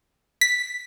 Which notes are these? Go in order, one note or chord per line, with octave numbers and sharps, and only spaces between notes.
B6